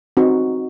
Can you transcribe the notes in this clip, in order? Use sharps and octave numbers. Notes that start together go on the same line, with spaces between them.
C4 D#4 F#4